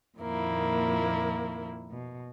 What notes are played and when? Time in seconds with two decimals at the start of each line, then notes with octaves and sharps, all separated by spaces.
0.19 F2 A#2 D#3 A#3 E4
1.92 B2